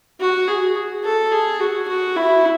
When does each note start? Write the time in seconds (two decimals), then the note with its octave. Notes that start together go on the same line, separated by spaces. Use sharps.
0.20 F#4
0.48 G#4
1.04 A4
1.32 G#4
1.60 F#4
1.88 F#4
2.16 E4